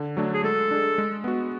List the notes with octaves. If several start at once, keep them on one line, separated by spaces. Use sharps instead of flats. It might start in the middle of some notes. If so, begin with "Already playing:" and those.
Already playing: D3
F#3 A3 D4
G#4
G#3 A4
D4 G#4
G#3
B3 F#4